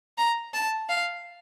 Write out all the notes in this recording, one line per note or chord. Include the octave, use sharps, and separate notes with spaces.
A#5
A5
F5